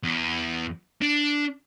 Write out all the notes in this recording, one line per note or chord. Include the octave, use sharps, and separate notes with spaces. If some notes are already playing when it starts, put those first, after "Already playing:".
E2
D4